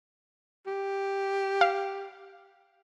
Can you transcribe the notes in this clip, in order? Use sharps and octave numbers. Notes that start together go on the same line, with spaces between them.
G4
F5